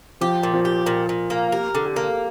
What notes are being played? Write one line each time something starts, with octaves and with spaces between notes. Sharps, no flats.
F3 G4
A#2
F3
G4
A#2
A#2
A#3
G4 A#4
D3
G4
A#3